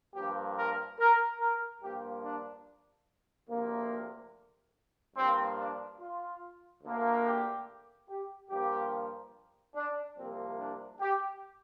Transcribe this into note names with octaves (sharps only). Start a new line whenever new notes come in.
G2 F3 A#3 G4
A#4
A#4
A#4
G2 F3 A#3 G4
D4
D2 C3 F3 A#3
G2 F3 A#3 C4
D4
F4
D2 D3 A#3
G4
G4
G2 F3 A#3 G4
D4
C2 C3 F3 A#3 C4
D4
G4